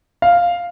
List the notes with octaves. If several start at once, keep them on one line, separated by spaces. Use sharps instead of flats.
F5